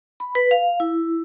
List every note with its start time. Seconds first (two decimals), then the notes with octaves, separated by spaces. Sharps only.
0.20 B5
0.35 B4
0.51 F5
0.80 E4